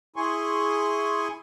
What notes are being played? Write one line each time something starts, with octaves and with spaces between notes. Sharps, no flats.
E4 G#4 G#5 C6 C#6